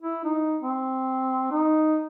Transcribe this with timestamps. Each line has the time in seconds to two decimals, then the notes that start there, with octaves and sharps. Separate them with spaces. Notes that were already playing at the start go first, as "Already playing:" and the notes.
0.02 E4
0.24 D#4
0.62 C4
1.51 D#4